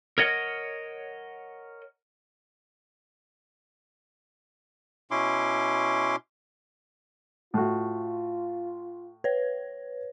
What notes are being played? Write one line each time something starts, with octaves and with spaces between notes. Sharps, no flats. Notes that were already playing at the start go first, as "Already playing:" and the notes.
A#4 C#5 D#5 F#5
B2 C#4 E4 C6 D6
A2 F4 F#4
B4 C#5